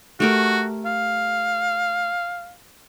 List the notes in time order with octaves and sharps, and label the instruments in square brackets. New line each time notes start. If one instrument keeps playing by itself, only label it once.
[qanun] A3 G4 A#4 [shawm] F#4
[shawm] F5